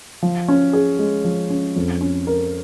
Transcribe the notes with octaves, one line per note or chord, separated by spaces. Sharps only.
F3
C#4
G#4
G#3
F3
C#4
F2
C#4
A#4